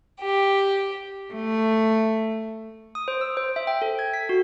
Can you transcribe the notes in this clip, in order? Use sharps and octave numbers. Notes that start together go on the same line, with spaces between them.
G4
A3
D#6
C5
E6
C5
E5
G5
A4
G#6
B6
F#4